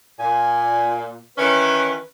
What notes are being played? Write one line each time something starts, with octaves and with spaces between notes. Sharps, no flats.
A#2 G#5
D#3 E3 C#4 B4